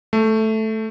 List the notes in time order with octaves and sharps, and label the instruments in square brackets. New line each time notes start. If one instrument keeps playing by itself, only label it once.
[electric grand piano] A3